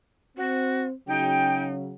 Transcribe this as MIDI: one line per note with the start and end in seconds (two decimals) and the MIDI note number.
0.37 0.92 60
0.37 0.82 66
1.08 1.93 49
1.08 1.93 54
1.08 1.93 61
1.08 1.72 63
1.08 1.65 79